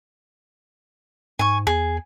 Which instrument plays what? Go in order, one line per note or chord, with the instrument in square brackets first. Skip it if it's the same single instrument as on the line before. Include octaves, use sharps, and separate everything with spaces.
[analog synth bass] G#2 [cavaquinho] G#5 C#6
[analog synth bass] E2 [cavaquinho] G#4